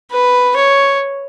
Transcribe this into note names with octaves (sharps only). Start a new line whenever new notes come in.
B4
C#5